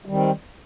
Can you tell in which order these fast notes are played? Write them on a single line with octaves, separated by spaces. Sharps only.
G3 D#3 C4